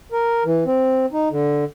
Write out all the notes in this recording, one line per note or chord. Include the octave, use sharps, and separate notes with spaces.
A#4
E3
C4
D#4
D3